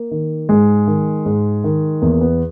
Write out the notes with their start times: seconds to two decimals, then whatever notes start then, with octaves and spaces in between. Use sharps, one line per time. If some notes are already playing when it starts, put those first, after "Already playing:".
Already playing: A#3
0.11 D#3
0.49 G#2 G#3
0.87 D#3
1.26 G#2
1.64 D#3
2.02 E2 A#3
2.21 B3